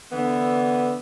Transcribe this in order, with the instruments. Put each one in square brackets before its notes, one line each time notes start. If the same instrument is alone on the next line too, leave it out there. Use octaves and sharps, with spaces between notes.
[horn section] D3 E3 B3